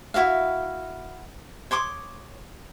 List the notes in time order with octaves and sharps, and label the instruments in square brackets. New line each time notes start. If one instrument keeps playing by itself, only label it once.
[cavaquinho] E4 F#4 E5 F5
C#5 C6 D6 D#6